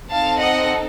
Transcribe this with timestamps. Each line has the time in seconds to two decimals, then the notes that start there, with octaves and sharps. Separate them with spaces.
0.12 C4 D#4 A4 F5 A5
0.41 D#5 F#5